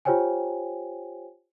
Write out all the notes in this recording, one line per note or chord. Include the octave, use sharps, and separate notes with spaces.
F4 G4 C5 C#5 G5 G#5